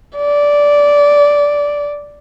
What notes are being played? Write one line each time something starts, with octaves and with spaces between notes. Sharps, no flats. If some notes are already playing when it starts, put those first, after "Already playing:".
D5